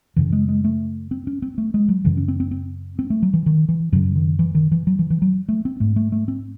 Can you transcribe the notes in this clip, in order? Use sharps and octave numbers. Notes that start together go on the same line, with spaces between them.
F#2 C#3 E3
G#3
G#3
A3
C4
C#4
C4
A3
G#3
F#3
F#2 C#3 E3
C#4
C4
C4
C4
C4
A3
F#3
E3
D#3
E3
F#2 C#3 F#3
D#3
E3
D#3
E3
F#3
E3
E3
F#3
A3
C4
G#2 A3
A3
A3
C4